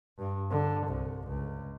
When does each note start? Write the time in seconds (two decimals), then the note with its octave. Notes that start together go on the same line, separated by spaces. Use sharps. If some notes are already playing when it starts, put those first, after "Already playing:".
0.19 G2
0.51 D3
0.87 C2
1.28 C#2